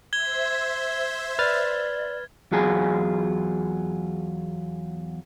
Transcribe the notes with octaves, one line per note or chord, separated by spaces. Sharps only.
C5 E5 G#6 G7
B4 D5 F6 A6
E2 F#3 F4 G#4 G#5